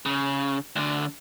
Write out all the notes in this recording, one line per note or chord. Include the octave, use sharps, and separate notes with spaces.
C#3
D2 D3